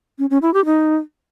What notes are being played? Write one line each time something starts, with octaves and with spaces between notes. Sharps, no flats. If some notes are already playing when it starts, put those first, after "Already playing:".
C#4
C#4
E4
G4
D#4